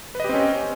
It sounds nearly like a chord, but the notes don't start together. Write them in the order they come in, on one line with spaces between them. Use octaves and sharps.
B4 D#5 G4 C4 C#4